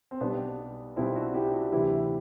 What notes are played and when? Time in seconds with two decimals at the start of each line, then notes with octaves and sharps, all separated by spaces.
0.11 C4
0.21 B1 B2 G3 B3 D4
0.96 B1 B2 G3 C4 E4
1.15 D4 F#4
1.34 E4 G4
1.54 D4 F#4
1.72 D2 C3 E3 E4 G4